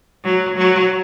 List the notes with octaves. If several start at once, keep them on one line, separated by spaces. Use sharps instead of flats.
F#3
F#3